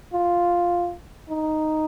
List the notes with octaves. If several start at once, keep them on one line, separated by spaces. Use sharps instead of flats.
F4
D#4